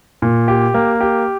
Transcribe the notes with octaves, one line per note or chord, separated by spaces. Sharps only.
A#2
G4
A#3
G4